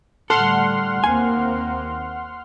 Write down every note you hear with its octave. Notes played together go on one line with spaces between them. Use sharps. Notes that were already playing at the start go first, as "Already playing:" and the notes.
A2 D3 G3 A4 F#5 C6 F6
D#2 A#3 C4 G#5